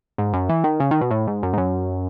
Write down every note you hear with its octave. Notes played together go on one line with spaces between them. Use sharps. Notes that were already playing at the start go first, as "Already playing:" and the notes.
G#2
F#2
E3
D#3
C#3
D#3
B2
A2
G#2
F#2
G#2
F#2